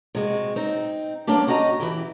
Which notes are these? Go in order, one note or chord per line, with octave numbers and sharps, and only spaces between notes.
C3 G#3 F#4
C4 D#4
G3 A#3 B3 C#4 D4 G4
C#4 F#4 G4 D#5 A#5
E3 E4 G4